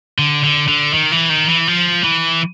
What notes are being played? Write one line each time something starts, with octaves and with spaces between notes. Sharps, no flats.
D3
D3
D3
D#3
E3
D#3
E3
F3
E3